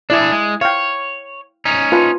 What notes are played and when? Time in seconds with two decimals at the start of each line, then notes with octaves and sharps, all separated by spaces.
0.10 D4 E4 G#4 D5
0.32 G#3
0.61 C#5 F5 G5
1.65 C#4 D#4
1.92 F4 B4 A5